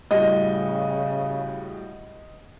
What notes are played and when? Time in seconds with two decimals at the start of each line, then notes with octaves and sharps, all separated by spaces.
0.11 A2 C#3 G3 F#4 D#5